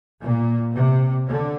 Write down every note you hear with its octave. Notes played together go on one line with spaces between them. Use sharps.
A#2
C3
D3